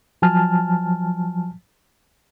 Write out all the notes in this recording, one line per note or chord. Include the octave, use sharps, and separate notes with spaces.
F3 F#3 G#5 A5 F6